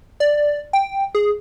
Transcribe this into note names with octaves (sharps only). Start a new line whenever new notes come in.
D5
G5
G#4